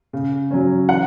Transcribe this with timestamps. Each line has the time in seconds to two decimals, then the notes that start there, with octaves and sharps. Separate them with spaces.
0.13 C#3
0.51 F#3 C#4
0.89 E3 F#5